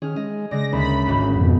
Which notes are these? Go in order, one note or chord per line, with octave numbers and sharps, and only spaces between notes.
D#3 C#4 G#4 F6
G#3 D#5
C#3 G#3 D5 A#6
D2 A#3 C#4 D#4 B5 A#6
G#1 G#2
F2 B2